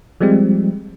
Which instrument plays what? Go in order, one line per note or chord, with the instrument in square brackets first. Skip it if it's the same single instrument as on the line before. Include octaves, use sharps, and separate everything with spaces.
[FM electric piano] F3 G3 G#3 C4